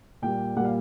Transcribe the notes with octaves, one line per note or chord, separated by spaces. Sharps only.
A#2 G3 A#3 G5
A#2 G3 A#3 F#5
F5